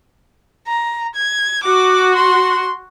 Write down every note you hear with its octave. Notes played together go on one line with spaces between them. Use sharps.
A#5
G#6
F#4 D6
C6